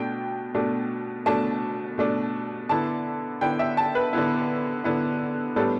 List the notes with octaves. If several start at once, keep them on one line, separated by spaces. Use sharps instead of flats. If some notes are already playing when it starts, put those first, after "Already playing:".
Already playing: B2 A3 D4 G5
B2 A3 D4
B2 A3 D4 A5
B2 A3 D4
D3 B3 E4 A5
D3 B3 E4 G5
E5
A5
B4
D3 B3 E4
D3 B3 E4
A2 G3 B3 D4 A4